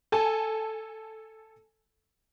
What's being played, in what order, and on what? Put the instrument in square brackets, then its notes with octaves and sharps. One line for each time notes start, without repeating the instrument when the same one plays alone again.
[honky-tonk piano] A4 G#5 A5